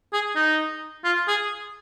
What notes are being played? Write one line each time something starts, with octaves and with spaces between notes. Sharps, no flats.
G#4
D#4
F4
G#4